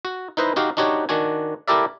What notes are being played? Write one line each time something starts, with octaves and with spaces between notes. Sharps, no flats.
F#4
D#4 E4 B4 C5 D#5
D#4 F#4 G4 F5
D4 D#4 F#4 G4 C#5
D#3 D4 F#4 G#5
E4 G4 A4 A#4 D5 E5